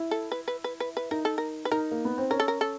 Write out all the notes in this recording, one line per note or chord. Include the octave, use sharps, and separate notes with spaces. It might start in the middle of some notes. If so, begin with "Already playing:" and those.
Already playing: E4
A4
B4
B4
B4
B4
B4
D#4 A#4
A4
A#4
B4
D#4 A#4
A#3
B3
C4
C#4 A#4
A4
A#4
A4